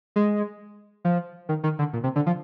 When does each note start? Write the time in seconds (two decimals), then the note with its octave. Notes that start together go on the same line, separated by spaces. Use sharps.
0.16 G#3
1.05 F3
1.49 D#3
1.63 D#3
1.79 D3
1.93 A#2
2.04 C3
2.16 D3
2.26 F3